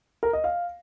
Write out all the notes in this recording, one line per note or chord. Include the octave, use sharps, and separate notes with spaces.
A#4
D#5
F5